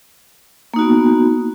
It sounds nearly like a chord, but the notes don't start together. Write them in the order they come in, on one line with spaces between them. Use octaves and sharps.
A#3 D#4 F#4 B3